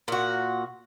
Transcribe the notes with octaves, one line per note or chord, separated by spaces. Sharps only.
A#2 F#4